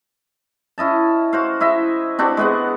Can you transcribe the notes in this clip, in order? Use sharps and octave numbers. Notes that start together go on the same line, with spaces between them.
C#4 E4 D#5 A5
F#4 C5 F5
E4 D#5 E5
C4 D4 F#4 G4
G#3 B3 F#5